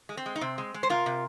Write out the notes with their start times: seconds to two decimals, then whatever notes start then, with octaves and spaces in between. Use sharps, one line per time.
0.09 G#3
0.17 C4
0.26 G#3
0.36 D#4
0.41 C3 C4
0.58 G#3
0.74 G#3
0.83 C5
0.89 C3 F4 A#4
1.06 C3